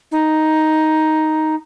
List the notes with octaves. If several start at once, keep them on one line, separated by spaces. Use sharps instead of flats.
D#4